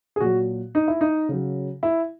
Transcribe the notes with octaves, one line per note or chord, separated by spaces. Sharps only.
G#4
A#2 F#3 F#4
D#4
E4
D#4
C#3 F#3
E4